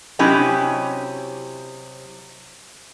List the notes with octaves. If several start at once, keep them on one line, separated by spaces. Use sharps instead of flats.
C3 F#3 C#4 E4 G4 D#5